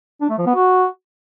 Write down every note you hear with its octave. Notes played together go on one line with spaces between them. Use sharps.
D4
A3
F3
B3
F#4